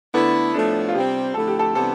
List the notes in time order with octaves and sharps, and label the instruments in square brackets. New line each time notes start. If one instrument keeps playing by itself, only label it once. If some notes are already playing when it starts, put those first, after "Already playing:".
[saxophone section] D3 A3 E4 [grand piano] B3
[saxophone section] A2 F3 A3 [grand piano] D4
[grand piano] F4
[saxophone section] C3 G3 C4 [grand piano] G4
[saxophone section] F2 D3 A3 E4 [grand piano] A4
[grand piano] G4
A4
[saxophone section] C3 E3 G3 B3 D4 [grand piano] A4